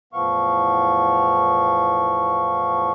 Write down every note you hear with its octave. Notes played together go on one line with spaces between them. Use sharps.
E2 A2 F3 B3 F5 C#6